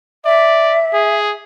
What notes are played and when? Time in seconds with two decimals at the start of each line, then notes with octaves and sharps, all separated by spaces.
0.25 D5 E5
0.93 G#4